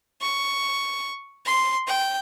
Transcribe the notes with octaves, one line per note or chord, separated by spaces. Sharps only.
C#6
C6
G5